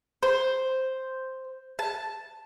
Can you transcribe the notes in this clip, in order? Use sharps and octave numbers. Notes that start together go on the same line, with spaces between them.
C5
A5